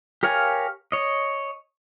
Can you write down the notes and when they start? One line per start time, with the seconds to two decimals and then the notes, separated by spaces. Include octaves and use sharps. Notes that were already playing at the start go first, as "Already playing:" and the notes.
0.23 G4 A#4 C#5 F5 G#5
0.92 C#5 D#5